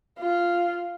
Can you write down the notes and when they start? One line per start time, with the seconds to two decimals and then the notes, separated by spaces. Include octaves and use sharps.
0.19 F4